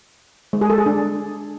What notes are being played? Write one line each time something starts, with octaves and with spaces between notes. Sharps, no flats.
G#3
G#4
A4
G#4
D4